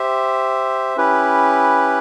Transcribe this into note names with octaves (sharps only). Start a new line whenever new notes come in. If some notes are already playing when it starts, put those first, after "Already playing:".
Already playing: G4 C5 E5
C#4 E4 G4 B4